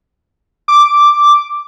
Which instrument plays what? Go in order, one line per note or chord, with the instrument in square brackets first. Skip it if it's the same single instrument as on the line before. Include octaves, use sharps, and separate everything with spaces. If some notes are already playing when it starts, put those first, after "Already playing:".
[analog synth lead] D6